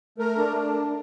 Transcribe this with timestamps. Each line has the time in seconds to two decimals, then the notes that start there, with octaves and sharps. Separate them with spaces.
0.18 A3 A#4
0.38 D4